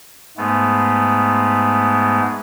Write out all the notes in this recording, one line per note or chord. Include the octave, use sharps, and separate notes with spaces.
G#2 G#3 A3 B3